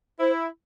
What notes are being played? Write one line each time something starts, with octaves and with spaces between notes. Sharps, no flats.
E4 C5